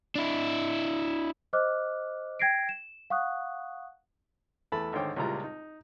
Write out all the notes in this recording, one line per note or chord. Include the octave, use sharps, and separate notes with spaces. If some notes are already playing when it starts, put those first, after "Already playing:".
D4 E4
C5 D#5 D6 F6 F#6
G5 G#6 A#6 C7 D7
E7
F5 F#5 C#6 D#6 F#6
E2 E3 A3 A5 B5
G#1 D3 C5 C#5 G5 D6
C#2 A#2 G3 G#3 E4 A#5
D#4